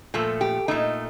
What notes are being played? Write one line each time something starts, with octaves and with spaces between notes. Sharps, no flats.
A#2 F3 A3 A4
G4
A#2 A3 D#4